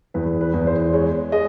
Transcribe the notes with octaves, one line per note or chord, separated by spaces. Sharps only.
E2 B4
B4
E2
C5
G#3 C#5
G#3 D#5